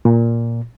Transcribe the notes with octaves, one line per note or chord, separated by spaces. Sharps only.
A#2